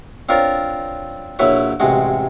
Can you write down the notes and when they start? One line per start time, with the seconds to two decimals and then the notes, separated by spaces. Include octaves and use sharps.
0.29 C4 D4 F4 A#4 C#5
1.39 A#1 F#3 E4 B4 C#5
1.80 A1 C3 G#3 F#4